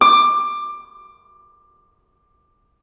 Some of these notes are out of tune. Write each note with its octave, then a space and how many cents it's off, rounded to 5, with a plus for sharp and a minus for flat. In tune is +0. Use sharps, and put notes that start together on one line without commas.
D6 +15